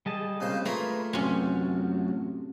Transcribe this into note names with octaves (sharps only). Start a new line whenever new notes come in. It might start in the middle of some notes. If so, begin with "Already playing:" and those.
G3 G#4 D#5 A5
A#2 C#3 G#3 C4 C#4 C5
A3 A#3 F4 G#4 B4 C#5 E5
A1 F#2 C3 F#3 C#4